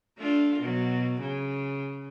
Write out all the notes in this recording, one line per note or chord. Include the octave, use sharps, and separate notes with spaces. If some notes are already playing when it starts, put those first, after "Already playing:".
A3 D4 F4
B2 F#3
C#3